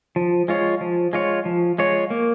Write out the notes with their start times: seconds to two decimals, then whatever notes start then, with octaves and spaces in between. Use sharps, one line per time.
0.16 F3
0.48 G#3 F4 C#5
0.81 F3
1.13 G#3 F4 C#5
1.45 F3
1.78 G#3 F4 C#5
2.10 A#3